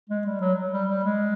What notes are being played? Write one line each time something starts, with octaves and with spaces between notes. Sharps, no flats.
G#3
G3
F#3
G3
G3
G#3